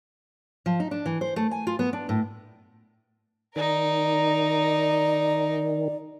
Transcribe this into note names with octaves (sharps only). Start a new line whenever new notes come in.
F3
D#4
D4
E3
C5
A3
G#5
F4
B3
D4
A2
D#3 D#4 A#4 D5